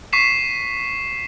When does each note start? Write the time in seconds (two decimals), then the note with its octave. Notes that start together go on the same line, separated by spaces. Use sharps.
0.13 C#6 B6 C7 E7